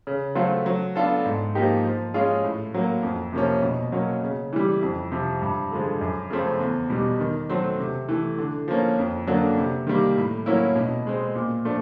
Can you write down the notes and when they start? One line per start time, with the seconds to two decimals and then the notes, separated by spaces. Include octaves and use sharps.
0.07 C#3
0.35 F#3 A3 C4 F4
0.66 F#3
0.96 B3 D4 F4 A4
1.26 G#2
1.55 F3 A#3 D#4 G4
1.84 F3
2.14 G#3 C#4 F4 G#4
2.44 A2
2.74 F#3 A#3
3.03 F2
3.33 C3 F3 A#3 C#4
3.63 B2
3.92 F#3 A#3 C#4
4.23 C#3
4.53 E3 G3
4.82 F2
5.12 C3 F3
5.41 G2
5.71 D3 F3 G#3
6.01 F#2
6.30 C#3 F3 A3 C4
6.60 E2
6.90 B2 G3
7.20 D#3
7.50 F#3 A3 C4
7.79 C3
8.09 E3 A3
8.39 D3
8.68 F3 A#3 C#4
8.99 F2
9.27 D3 F#3 A#3 D4
9.57 C3
9.87 D#3 G3 A#3
10.17 A2
10.46 F#3 A#3 C#4 E4
10.76 B2
11.07 G#3 C4
11.35 A#2
11.65 F3 A3 D4